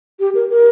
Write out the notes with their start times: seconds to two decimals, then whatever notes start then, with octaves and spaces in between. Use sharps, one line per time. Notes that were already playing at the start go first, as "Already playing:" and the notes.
0.20 G4
0.35 A#4
0.50 A#4